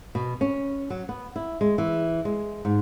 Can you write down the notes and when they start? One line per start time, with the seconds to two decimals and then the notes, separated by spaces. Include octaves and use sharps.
0.15 B2
0.41 C#4
0.90 F#3
1.09 B3
1.36 E4
1.61 G#3
1.78 E3
2.25 G#3
2.65 G#2